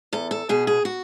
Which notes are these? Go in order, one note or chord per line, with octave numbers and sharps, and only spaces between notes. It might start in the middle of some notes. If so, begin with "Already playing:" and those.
E2 A4
A4
B2 G#4
G#4
F#4